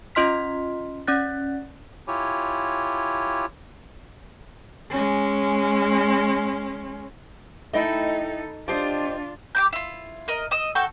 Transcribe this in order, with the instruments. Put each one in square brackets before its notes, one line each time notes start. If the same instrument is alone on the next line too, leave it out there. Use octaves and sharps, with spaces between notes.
[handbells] C#4 F4 D#5 C6 F6 B6
C#4 D5 F#5 F#6 A6
[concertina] E4 F4 G4 C#5 G#5
[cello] G#3 C#4
[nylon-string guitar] A3 E4 [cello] D#4 A4 [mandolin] D#5 G5 B5
[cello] D4 F4 [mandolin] G4 C5 D#5 [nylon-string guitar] A5
[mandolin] G4 D6 G6
E4 F4
A#4 D#5
D#5 D#6 E6
F#4 A4 G5 C#6